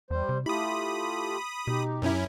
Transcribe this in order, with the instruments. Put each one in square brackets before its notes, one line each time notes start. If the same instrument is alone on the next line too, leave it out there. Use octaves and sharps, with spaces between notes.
[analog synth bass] E2 [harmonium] G3 C5
[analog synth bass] C3
[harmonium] A3 F4 G4 [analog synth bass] E4 [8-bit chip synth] B5 D#6
[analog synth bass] B2 [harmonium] D#4 G4
[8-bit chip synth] F#2 C#4 E4